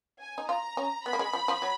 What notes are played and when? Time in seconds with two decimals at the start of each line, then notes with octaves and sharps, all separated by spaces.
0.21 G#5
0.38 D#4
0.49 F4 A#5
0.77 C#4
1.06 B3 B5
1.13 A#3
1.19 G#3
1.33 F3
1.48 F3
1.62 F#3